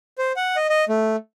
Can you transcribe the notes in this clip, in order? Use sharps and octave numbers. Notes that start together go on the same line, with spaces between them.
C5
F#5
D#5
D#5
A3